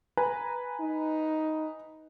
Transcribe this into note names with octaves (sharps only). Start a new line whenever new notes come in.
B4 G#5 A#5
D#4